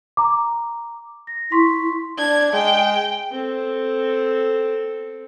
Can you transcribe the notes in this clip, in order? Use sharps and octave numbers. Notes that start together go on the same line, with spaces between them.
A#5 D6
A#6
E4 C6 C#6 B6
D4 G#6
G#3 G5
C4 A4